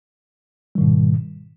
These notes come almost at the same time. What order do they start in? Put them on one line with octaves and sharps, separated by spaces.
G3 D#3 G#2 B2